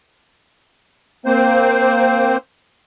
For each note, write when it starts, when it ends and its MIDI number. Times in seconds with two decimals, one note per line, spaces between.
1.26 2.37 58
1.26 2.37 60
1.26 2.37 72